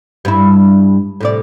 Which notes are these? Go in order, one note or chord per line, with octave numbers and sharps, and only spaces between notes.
G2 E4
A2 C3 D5